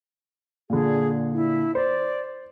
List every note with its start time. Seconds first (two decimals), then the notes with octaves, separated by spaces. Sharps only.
0.70 A#2 D3 G#4
1.33 E4
1.75 C5 D5